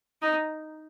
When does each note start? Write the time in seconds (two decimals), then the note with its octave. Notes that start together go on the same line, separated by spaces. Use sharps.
0.22 D#4